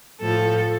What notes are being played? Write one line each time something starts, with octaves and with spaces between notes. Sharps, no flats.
A2 F3 A4